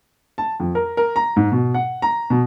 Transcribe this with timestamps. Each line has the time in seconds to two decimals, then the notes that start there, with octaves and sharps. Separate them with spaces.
0.38 A5
0.60 F2
0.75 A#4
0.97 A#4
1.16 A#5
1.36 G#2
1.52 B2
1.74 F#5
2.02 A#5
2.30 B2